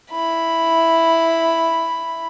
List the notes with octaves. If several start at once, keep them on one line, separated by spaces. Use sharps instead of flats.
E4 B5